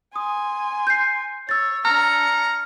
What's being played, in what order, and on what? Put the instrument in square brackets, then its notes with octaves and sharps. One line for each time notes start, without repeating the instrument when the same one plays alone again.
[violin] G#5 C6 [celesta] D#6
[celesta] G6 C7
[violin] C#5 [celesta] E6 A6
[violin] D4 C#7 [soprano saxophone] A#5 [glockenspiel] F6